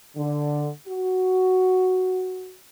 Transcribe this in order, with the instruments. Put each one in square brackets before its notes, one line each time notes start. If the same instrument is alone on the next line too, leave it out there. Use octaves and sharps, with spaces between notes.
[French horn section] D3
F#4